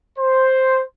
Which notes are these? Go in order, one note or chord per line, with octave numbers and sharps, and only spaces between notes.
C5